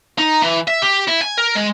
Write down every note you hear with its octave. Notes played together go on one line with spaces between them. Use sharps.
D#4
E3
E5
G4
E4
G#5
A#4
G#3